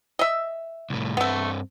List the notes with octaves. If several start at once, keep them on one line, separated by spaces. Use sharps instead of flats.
D#5 E5
C2 A2
G2 A3 B3 C4